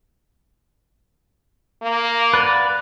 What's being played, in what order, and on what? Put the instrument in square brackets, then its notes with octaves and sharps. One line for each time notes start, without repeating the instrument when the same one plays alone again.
[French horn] A#3
[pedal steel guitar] B4 D5 F#5